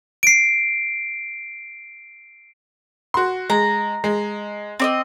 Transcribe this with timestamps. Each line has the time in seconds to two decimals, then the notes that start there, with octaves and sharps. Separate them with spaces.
0.23 C7 D7
3.14 F#4 C6
3.50 G#3 A#5
4.04 G#3
4.80 C4 D5 D#5